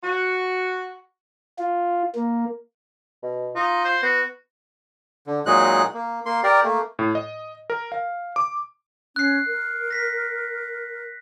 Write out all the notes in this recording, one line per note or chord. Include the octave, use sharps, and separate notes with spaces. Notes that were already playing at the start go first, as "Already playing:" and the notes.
F#4
F4
A#3
B2
D#4 F4
C5
B3 F#4
D3
A#2 F#3 G#3 D#4 F#6
A#3
A#3 C6
G4 A#4 D5
A3 A#3
A2
D#5
A#4
F5
D6
C#4 F#6 C7
A#4
A#6 B6